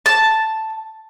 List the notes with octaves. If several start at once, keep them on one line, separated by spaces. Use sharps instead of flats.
A5